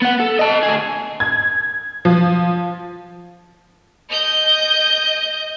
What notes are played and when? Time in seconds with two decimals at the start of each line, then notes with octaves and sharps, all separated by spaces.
0.02 B3 F#5
0.20 A4
0.39 D#5 A5
0.63 D2 G#4
1.20 G#6
2.05 F3
4.09 D#5 G6